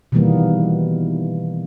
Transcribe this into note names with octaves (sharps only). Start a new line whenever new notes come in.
B2 D#3 E3 G3 A#3 B3